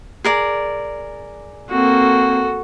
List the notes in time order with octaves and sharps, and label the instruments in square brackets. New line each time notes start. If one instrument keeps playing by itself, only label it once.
[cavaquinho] G#4 A#4 D5
[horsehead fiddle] A#3 C4 [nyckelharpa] F#4 A4